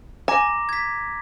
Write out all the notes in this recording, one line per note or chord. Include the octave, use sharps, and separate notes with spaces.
G#5 A#5 D6 A#6
G#6 B6